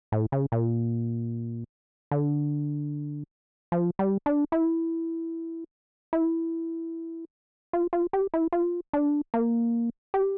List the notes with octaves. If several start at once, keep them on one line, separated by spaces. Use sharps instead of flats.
A2
C#3
A#2
D3
F3
G3
D4
E4
E4
F4
F4
G4
E4
F4
D4
A#3
G4